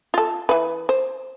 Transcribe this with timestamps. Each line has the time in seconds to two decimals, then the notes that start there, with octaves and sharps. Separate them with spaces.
0.14 F4 A4
0.49 E3 B4
0.89 C5